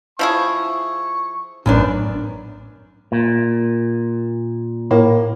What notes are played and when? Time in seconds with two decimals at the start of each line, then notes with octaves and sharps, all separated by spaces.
0.19 F3 E4 G#4 C#6
1.66 A1 F#2 D#3 B3 D4
3.12 A#2
4.91 A2 A#3